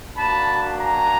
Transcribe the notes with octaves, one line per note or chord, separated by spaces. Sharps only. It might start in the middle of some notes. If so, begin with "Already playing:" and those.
A#3 D4 F#4 A5 B5
G#5 A#5